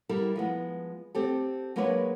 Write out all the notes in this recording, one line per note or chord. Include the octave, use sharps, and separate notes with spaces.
G3 E4 A4 A#4
F3 G#3 B3
C4 G4 A4
F#3 G#3 A#3 D4 B4 C#5